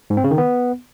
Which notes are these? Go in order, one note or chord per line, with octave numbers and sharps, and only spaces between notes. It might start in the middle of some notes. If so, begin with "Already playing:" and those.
G#2
C4
C#3
D#3
B3